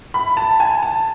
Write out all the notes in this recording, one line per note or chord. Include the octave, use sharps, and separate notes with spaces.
B5
A5
G#5
A5